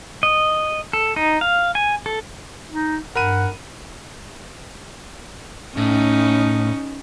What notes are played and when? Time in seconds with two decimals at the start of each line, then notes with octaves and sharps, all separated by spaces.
0.23 D#5
0.93 A4
1.16 D#4
1.41 F5
1.75 G#5
2.06 A4
2.69 D#4
3.15 G2 A#4 F#5 B5 D#7
5.77 A2 C#4 D#4